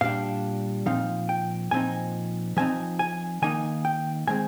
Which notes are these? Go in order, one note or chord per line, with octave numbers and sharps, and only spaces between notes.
A#2 G3 D4 F5
A#2 F3 C4 D#4 F5
G5
A#2 F3 C4 D#4 G#5
F3 C4 D#4 G#5
G#5
D#3 A#3 D#4 G#5
G5
D#3 G#3 C4 G#5